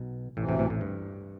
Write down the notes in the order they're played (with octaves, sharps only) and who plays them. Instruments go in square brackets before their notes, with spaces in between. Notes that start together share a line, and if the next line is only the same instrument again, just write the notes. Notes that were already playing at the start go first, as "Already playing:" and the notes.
Already playing: [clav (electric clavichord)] B1 B2
[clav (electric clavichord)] A1 A2 [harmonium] D2 C3 E3
[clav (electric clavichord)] A1 A2
A1 A2
A1 A2
G2